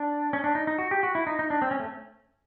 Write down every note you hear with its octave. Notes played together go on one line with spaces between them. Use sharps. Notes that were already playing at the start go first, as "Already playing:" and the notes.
Already playing: D4
C#4
D4
D#4
D#4
F#4
G4
F#4
E4
D#4
D#4
D4
C4
C#4
A3